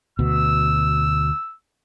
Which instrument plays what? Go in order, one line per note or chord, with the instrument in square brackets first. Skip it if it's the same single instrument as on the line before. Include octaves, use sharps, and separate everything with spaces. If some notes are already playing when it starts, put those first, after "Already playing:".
[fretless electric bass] D2 B2 [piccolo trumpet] E6